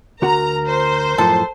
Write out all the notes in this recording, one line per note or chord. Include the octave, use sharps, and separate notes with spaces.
D2 F#4 A#4 F#5 A#5
C5
F#2 A2 F3 A4